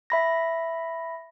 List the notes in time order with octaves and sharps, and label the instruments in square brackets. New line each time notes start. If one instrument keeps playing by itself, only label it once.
[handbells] E5 B5 A#6